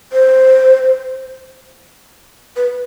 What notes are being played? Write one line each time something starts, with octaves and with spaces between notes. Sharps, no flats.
C5
B4